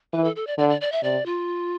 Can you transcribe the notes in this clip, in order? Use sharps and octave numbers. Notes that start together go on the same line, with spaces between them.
E3 B4
A4
A4
D5
D3 D5
D5
D5
E5
C3 D5
F4